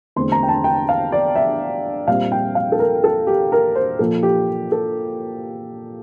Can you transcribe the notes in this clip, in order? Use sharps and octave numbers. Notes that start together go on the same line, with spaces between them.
E2 D3 A3 C4 C6
A#5
G5
A5
G5
F5
D5
E5
A#2 G3 C4 F5
G5
F5
A4
A#4
A4
G4
A#4
C5
A#2 F3 A#3 A4
G4
A4